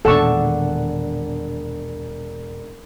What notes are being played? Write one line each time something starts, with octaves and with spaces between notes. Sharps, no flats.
E1 A#2 D#3 D4 A4 F#5 C#6 E7